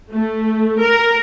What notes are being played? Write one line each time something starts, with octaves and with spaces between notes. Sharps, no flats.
A3
A#4